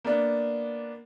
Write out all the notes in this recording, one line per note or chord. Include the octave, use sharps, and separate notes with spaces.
A#3 B3 D4